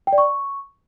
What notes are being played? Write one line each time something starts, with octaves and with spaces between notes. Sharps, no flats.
G5
D5
C#6